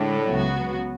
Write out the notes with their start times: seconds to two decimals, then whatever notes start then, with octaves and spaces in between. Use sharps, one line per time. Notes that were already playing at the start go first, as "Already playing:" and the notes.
Already playing: A2 D3 G#3 D4
0.30 C#2 C#3 F#3 B3 F#4